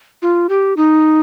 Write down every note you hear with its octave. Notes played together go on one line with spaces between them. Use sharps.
F4
G4
D#4